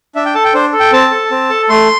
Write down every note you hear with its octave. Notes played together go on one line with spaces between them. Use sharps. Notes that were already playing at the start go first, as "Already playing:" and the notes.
D4 E5
G5
A4 A5
G5
D4 C5
A4
G5
C4 A5
A4
C4
A4
A3 C6